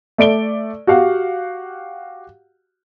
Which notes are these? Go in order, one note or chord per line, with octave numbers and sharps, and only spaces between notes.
A3 D5 D7 G7
F#4 G4 F5 F#5